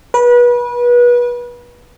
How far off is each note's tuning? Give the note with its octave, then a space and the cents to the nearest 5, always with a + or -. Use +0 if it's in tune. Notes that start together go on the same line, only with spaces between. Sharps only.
B4 -30